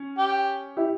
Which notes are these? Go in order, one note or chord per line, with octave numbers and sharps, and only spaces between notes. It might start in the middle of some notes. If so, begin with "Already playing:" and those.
Already playing: C#4
G4
E4 G4